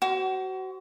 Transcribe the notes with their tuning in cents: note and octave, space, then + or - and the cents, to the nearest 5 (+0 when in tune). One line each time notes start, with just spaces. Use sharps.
F#4 +30 C5 -5